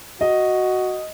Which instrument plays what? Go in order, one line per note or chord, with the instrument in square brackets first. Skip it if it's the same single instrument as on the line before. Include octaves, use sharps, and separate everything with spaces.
[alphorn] F#4 [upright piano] D#5